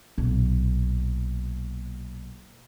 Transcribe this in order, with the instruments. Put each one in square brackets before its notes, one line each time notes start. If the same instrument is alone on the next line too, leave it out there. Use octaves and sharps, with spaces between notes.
[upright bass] B1 A#2